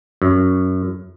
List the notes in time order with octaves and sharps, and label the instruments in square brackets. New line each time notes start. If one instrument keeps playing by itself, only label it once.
[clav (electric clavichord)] F#2